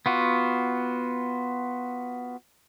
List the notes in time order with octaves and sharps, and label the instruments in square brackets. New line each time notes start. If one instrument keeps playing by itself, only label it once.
[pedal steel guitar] B3 F4 F#4